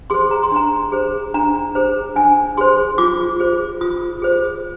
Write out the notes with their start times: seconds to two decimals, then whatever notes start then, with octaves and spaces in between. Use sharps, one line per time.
0.10 G#4 C5 C6
0.31 A#5
0.43 C6
0.51 D4 A#5
0.92 G#4 C5
1.34 D4 A#5
1.75 G#4 C5
2.16 D4 G#5
2.57 G#4 C5 C6
2.98 F4 D6
3.39 G#4 C5
3.81 F4 D#6
4.22 G#4 C5